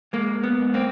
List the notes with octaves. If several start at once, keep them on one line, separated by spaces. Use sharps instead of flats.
G#3 A#3
B3
G#2
A#3 C4